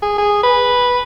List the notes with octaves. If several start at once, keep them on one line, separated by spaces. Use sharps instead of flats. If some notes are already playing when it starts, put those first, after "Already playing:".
G#4
G#4
B4